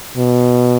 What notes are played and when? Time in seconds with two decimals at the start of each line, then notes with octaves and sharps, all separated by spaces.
0.18 B2